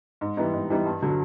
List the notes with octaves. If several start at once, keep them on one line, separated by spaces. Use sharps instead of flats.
G#2
E3 G3 B3 D#4
G#2
E3 G3 B3 D#4
G2
D3 F#3